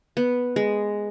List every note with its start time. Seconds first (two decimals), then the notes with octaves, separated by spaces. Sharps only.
0.17 B3
0.56 G#3